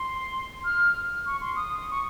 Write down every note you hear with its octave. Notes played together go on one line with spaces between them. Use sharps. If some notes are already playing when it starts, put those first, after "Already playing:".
Already playing: C6
F6
C#6
C6
D#6
C#6